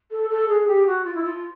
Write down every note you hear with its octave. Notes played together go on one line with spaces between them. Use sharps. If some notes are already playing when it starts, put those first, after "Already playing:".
A4
A4
G#4
G4
F#4
F4
E4
F4